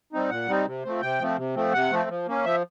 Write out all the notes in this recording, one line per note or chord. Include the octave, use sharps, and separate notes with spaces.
G3 C4 D#4
A#2 F#5
G3 C4 D#4
C3
F3 A3 C4
C3 G5
F3 A3 C4
C3
F3 A3 C4
C3 F#5
F3 A3 C4
F3
A#3 C#4
F3 E5